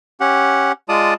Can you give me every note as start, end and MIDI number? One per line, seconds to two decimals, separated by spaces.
0.20 0.72 61
0.20 0.72 67
0.20 0.72 78
0.89 1.14 56
0.89 1.14 65
0.89 1.14 74
0.89 1.14 81
0.89 1.14 87